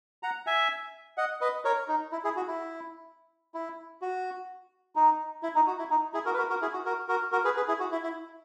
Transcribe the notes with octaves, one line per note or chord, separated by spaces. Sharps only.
F#5 A#5
E5 G#5
D#5 F#5
B4 D#5
A#4 C#5
D#4
E4
E4 G#4
F#4
E4
E4
F#4
D#4
E4
D#4
F#4
E4
D#4
E4 G#4
F#4 A#4
B4
F#4 A#4
F#4 A#4
E4 G#4
F#4
F#4 A#4
F#4 A#4
F#4 A#4
G#4 B4
G#4 B4
E4 G#4
F#4
E4
E4